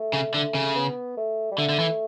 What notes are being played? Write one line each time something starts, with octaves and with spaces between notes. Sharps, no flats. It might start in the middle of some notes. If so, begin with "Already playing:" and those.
Already playing: A3
C#3
D3 A3
C#3
B3
A3
G3
D3 A3
D3
E3